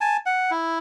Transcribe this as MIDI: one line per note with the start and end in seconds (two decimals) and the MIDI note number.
0.01 0.17 80
0.01 0.17 81
0.26 0.51 78
0.51 0.79 64